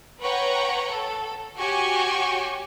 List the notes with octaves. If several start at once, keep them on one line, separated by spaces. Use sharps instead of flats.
B4 C#5 F#5 G5 A#5 C#6
A4
F#4 G4 C#5 G5 G#5 C#6